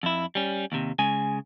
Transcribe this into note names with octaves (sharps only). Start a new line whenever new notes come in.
F2 E4
G3 C#4
D#2 C3
C#3 G#3 G#5